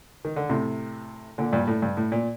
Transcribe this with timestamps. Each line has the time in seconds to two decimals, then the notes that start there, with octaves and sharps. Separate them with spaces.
0.25 D#3
0.36 D3
0.49 A2 C3
1.38 A#2 D3
1.53 G2 A#2
1.67 A2
1.82 G2
1.97 A2
2.12 A#2